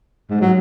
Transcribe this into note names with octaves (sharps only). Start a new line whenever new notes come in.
G#2
F#3